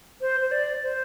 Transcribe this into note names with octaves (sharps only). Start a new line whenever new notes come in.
C5
C5
D5
C5